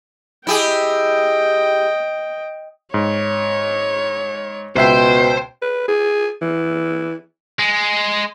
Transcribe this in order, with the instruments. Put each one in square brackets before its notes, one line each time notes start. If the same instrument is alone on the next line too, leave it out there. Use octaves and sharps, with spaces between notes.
[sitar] E4 G4 G#4 [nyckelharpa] D#5 G5
[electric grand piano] G#2 [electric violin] C#5
[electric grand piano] C#2 E5 C7 [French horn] B2 [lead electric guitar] C5 [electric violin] G5
[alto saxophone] B4
G#4
E3
[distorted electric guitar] G#3